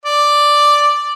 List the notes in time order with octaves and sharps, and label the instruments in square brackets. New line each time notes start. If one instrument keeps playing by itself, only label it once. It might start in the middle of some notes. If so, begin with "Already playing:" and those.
[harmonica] D5